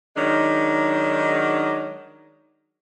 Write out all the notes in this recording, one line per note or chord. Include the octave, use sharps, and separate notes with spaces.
D#3 F#3 G#3 D4 D#4